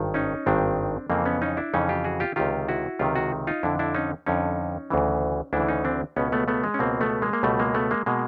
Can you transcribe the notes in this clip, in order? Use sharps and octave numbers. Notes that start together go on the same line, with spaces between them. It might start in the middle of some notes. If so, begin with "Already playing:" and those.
Already playing: G#1 G2 D#3
C#4 D#4
G#1 G2 D#3 C4 D4
F2 C#3 E3 A#3 C4
B3 C#4
C#4 D#4
D4 E4
F2 C#3 E3 C#4 D#4
F4 G4
F#4 G#4
F4 G4
C#2 C3 D#3 F4 G4
E4 F#4
C#2 C3 D#3 F4 G4
F#4 G#4
D#4 F4
F2 D3 D4 E4
D4 E4
C#4 D#4
F2 D3 C#4 D#4
D2 C#3 E3
D2 C#3 E3 D4 E4
C#4 D#4
C4 D4
C#2 B2 B3 C#4
A3 B3
A3 B3
G#3
C#4
C#2 B2 A#3 C4
A3 B3
G#3 A#3
A#3
C#2 B2 G3 A3
G#3 A#3
A3 B3
G#3 A#3
B2 G#3 A#3